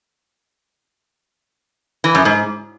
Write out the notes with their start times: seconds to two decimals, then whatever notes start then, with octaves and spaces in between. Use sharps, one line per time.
2.04 E3
2.15 F#2
2.25 G#2